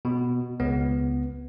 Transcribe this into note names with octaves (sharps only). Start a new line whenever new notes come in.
B2
C#2 B3